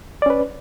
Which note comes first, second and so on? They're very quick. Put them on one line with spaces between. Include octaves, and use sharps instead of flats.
D5 C#4 B4